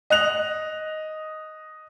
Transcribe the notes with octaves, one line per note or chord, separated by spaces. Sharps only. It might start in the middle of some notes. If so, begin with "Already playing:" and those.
D#5 F#6 F7